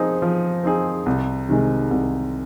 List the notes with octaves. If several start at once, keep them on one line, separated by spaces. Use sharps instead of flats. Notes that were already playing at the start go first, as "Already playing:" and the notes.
Already playing: F3 C4 D#4 G#4
F3
C4 D#4 G#4
C2
C3 D#3 G#3
C2